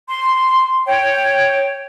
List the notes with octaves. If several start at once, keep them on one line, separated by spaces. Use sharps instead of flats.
C6
C#5 G5